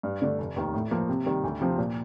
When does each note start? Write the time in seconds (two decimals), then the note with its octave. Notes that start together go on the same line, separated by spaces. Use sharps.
0.03 G2
0.22 D3 A3 D4
0.39 F1
0.56 D#2 D#3
0.73 A2
0.91 F3 A#3
1.09 C3
1.26 D#3 G3
1.44 D2
1.61 C3 F3 C4
1.78 A#2